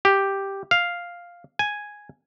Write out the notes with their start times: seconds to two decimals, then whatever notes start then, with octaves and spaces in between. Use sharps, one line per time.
0.05 G4
0.71 F5
1.59 G#5